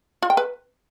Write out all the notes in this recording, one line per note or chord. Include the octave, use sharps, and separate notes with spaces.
F4
G5
B4